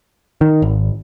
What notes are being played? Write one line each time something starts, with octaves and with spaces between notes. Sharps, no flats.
D#3
G#1